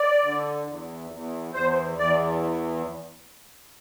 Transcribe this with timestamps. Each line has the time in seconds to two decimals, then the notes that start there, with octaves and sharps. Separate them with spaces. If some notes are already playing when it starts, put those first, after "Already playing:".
Already playing: D5
0.24 D3
0.67 E2
1.12 E2
1.54 E2 C5
1.98 E2 D5